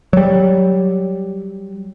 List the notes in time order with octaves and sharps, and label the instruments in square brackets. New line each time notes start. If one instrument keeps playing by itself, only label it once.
[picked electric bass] F#3 G3